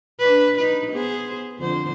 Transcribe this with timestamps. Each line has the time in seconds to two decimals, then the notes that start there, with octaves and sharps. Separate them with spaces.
0.20 D4 B4
0.58 D#4 B4
0.92 B3 G#4 C5
1.58 F2 D3 C5